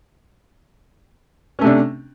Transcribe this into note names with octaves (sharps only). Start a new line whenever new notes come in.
C3 A3 C#4 D4